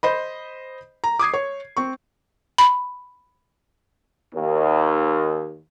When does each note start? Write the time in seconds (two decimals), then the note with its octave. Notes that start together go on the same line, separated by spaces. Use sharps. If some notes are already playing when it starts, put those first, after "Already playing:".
0.03 C5 D#5 B5
1.04 A#5
1.19 D6 D#6 G#6 C7
1.34 C#5
1.77 C4 C#6
2.58 B5
4.34 D#2